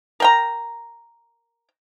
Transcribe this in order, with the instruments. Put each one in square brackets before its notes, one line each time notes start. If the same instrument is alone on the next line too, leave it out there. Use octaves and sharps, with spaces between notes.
[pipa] A#4 G5 A#5